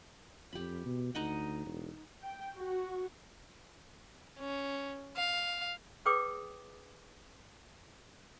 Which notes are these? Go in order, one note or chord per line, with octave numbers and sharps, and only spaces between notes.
F2 G4 B5
B2
D2 D#4 D#5 F#5
E1
G5
F#4
C#4
F5
G#4 B4 C#5 G5 D6 D#6